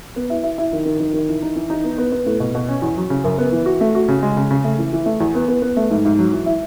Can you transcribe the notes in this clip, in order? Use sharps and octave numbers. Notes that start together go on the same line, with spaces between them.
B3
E4
E4
E4
D#3
D#3
D#3
D#3
E3
D#4
E3
D#4
B3
B3
B3
A2
B2
B2
C#4
E2
F#3
C#3
F#2
B3
E3
F#4
A3
F#4
C#3
G#3
C#3
C#3
A3
E3
E3
A3
E2
B3
B3
B3
A3
G#2
G#2
F#3
E3
E4